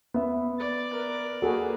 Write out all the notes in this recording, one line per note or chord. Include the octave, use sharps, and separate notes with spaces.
B3 E5
D5 A6
A#4 B4
A#3 F#4 G#4 A4 B4